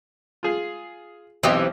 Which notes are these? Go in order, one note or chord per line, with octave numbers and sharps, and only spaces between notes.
F4 G#4
B1 E3 C4 G4 D#5 D#6